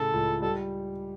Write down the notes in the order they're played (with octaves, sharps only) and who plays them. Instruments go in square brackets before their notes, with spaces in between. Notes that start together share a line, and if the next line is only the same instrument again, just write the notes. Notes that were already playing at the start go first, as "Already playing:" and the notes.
Already playing: [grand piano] A2 C#3 [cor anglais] A4
[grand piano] C#2
[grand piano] G3 [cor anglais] A4